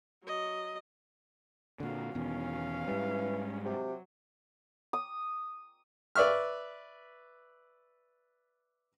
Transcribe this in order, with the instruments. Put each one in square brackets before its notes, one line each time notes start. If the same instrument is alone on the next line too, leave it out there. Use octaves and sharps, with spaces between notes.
[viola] F#3 D#5
[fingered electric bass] A#2 D3 [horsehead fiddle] F#4 F5
[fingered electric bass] E2 B2 D#3 [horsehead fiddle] C#4 F5
[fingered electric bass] G#2 G3 [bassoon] E3
[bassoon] C3 [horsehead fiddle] F#3
[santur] D#6
[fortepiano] B4 D5 E5 C#6 F6